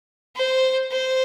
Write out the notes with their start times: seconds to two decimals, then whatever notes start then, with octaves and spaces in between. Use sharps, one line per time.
0.36 C5
0.92 C5